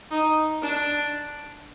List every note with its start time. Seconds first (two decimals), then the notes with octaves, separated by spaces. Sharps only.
0.11 D#4
0.62 D4